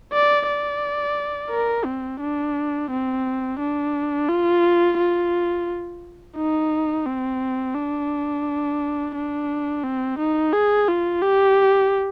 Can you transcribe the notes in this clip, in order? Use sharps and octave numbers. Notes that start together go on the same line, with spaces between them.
D5
D5
A#4
C4
D4
C4
D4
F4
F4
D#4
C4
D4
D4
C4
D#4
G#4
F4
G4